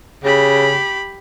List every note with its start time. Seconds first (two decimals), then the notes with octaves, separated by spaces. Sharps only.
0.24 C#3 G4 B5